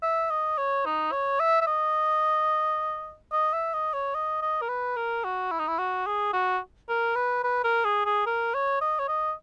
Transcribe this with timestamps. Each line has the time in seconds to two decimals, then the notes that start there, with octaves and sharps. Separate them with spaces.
0.02 E5
0.30 D#5
0.58 C#5
0.85 D#4
1.12 C#5
1.40 E5
1.61 E5
1.67 D#5
3.32 D#5
3.53 E5
3.74 D#5
3.94 C#5
4.15 D#5
4.42 D#5
4.62 A#4
4.69 B4
4.97 A#4
5.24 F#4
5.52 E4
5.59 D#4
5.68 E4
5.79 F#4
6.07 G#4
6.34 F#4
6.89 A#4
7.16 B4
7.44 B4
7.64 A#4
7.84 G#4
8.06 G#4
8.26 A#4
8.54 C#5
8.81 D#5
8.99 C#5
9.08 D#5